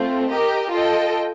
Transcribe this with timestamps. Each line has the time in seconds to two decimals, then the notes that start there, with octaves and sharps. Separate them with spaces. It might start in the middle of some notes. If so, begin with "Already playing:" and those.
Already playing: A3 C4 F4
0.29 G4 A#4 D#5
0.71 F4 A4 D#5 G5